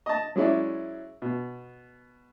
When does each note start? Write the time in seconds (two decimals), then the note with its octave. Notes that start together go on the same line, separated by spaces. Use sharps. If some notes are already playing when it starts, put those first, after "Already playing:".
0.06 D#5 A5
0.36 F#3 G#3 C#4 E4 D5
1.22 B2